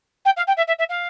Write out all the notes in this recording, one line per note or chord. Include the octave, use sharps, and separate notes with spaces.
G5
F5
G5
E5
E5
E5
F5